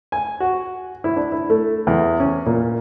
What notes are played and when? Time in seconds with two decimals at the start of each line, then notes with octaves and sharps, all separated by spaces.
0.12 G#5
0.40 F#4
1.04 E4
1.16 D4
1.32 E4
1.50 A3
1.87 E2
2.20 C#4
2.46 A#2